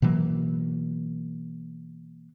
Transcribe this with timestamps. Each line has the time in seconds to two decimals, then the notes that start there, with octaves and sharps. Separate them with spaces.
0.02 B2 E3 F#3 A#3